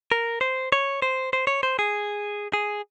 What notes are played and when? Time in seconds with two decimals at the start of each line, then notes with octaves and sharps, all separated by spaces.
0.12 A#4
0.41 C5
0.72 C#5
1.02 C5
1.33 C5
1.47 C#5
1.63 C5
1.79 G#4
2.54 G#4